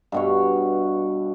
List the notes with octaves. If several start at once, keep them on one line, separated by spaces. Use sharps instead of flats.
G2 B2 C#5